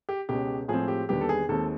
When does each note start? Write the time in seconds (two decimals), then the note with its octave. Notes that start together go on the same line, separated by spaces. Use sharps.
0.09 G4
0.29 C#2 B2 G#3 C#4 G4
0.68 A2 F3 G#3 C4 G#4
0.88 G4
1.09 D#2 D3 G3 B3 G4
1.21 A4
1.29 G#4
1.49 D#2 D#3 G#3 C4 A4